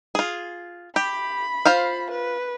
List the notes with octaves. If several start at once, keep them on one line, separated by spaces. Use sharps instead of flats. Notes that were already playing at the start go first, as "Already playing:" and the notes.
F4 G#4
G4 B5
F4 C5 F5
B4